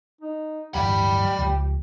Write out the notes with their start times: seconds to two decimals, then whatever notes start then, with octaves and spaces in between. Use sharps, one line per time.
0.21 D#4
0.74 D1 G2 E3 G4 D5 B5
1.38 C#2 F3